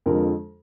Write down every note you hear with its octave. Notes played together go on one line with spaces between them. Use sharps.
F2 D3 F3 G#3 A#4